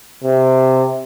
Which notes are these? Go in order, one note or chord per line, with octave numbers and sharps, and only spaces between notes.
C3